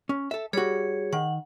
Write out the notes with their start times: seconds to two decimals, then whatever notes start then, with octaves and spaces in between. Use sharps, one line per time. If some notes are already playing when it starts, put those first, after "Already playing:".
0.09 C#4
0.31 A4 E5
0.53 G3 F#4 G#4 C#5
1.13 D#3 F#5